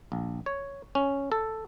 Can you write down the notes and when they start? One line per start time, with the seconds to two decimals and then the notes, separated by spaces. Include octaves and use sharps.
0.12 A#1
0.46 C#5
0.95 C#4
1.32 A4